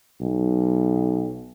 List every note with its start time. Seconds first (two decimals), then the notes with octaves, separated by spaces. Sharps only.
0.21 B1